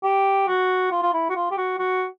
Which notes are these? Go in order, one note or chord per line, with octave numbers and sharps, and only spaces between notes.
G4
F#4
F4
F4
E4
F#4
F4
G4
F#4
F#4